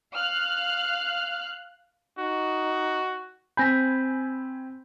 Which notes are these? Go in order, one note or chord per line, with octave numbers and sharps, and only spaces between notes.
F5 F6 F#6
D#4 F#4
C4 G#5 B5 G6 A#6 B6